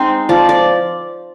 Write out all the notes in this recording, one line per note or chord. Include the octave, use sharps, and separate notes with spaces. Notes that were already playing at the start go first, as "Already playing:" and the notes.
Already playing: G#3 C4 D#4 C5
F3 D5
D5